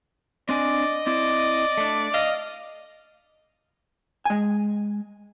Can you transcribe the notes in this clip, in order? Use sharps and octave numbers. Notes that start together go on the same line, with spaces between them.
C4 D4 D5 D#5 G#5
C4 E4 D5
A3 D4
D#5 F5
G#3 G#5